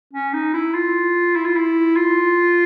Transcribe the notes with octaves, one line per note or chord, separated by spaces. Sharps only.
C#4
D#4
E4
F4
E4
F4
E4
F4